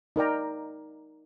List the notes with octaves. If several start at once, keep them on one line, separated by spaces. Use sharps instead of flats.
D#4 A#4 D5 G5 A#5